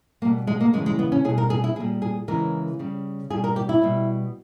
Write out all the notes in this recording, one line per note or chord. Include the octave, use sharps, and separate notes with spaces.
B2 G3 A#3
G#3
A#3
C#3 E3 G3 G#3
G#3
B3
C#4
B2 G3 G#4
A#4
G#4
E4
A#2 G3 G#4
G#4
C#3 E3 G#3 A#4
C#3 G3
B2 G3 G#4
A#4
G4
E4
B2 G3